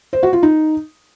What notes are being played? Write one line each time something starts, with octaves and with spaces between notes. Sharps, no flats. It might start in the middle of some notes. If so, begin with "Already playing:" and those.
C5
F#4
F4
D#4